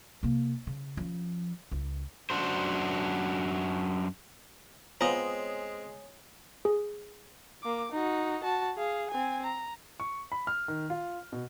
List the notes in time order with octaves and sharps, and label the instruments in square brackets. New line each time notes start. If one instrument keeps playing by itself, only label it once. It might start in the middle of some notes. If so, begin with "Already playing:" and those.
[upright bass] C3 A#3
C#3
F3 C#4
C#2
[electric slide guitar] F#2 D4 F#4 C5
[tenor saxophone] G#3 [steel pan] B3 F4 A#5 [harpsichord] C4 [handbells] C#5 G#5 D#6
[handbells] G#4
[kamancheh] A#3 D6
D#4 F#4
F#4 A5
G#4 F5
C4 G#5
A#5
[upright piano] C#6
B5
F6
D#3
F4
B2